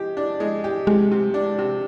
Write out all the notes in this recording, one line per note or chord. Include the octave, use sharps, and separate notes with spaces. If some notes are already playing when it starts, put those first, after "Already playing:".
Already playing: G#3 G4
D4
G#3
G4
C3 G#3
C3
D4
C3